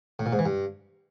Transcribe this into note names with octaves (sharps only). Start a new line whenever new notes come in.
A2
A#2
G#2
E3
G2